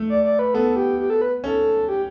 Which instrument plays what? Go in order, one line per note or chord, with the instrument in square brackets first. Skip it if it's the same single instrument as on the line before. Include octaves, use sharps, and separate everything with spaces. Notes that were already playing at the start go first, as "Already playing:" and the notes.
Already playing: [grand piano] A3
[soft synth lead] D5
D5
B4
[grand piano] B3 [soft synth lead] A4
[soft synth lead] G4
G4
A4
B4
[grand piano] C#4 [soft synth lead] A4
[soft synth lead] G4